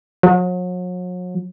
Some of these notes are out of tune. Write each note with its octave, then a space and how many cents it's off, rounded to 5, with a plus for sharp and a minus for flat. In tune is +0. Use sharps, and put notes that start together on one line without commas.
F#3 -40